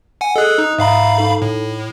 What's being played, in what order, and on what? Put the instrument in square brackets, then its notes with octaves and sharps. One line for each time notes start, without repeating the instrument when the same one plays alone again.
[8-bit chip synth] F#5 G#5
[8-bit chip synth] G#4 A4 [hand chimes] D#5 F#6
[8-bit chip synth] D#4 [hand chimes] D#6
[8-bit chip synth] G#2 F5 B5 [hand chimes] E5 A#5
[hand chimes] D#4 A4
[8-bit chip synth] A2